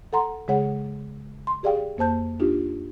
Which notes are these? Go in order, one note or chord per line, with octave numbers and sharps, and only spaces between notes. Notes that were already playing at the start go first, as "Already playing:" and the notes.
A4 F#5 A#5 C6
C#3 G#3 G#4 C#5 F#5
C6
G4 G#4 D5 F5 G5
F2 A#3 C5 A5 G6
D4 D#4 F4 G4